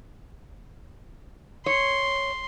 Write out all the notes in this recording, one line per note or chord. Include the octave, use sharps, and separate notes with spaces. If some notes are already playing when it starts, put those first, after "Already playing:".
C#5 C6